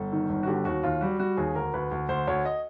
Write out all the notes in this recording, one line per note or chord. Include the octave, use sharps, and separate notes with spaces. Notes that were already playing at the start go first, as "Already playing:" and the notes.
Already playing: G1 A4
D#3
G1
F#4
D3 G4
D#2 F#4
D#2 F4
G3 F#4
G3 F#4
D#2 G#4
D2 A#4
D2 B4
D2
D2 C5
D2 C#5
D#5